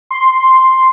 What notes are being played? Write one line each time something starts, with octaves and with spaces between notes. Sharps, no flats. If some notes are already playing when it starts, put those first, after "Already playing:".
C6